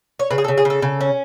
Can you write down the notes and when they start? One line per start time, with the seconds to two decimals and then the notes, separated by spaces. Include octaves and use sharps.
0.19 C#5
0.31 C#3 B4
0.38 G#4
0.44 A4
0.48 C#3
0.58 G#4
0.65 C#3
0.70 A4
0.82 C#3
1.01 C#4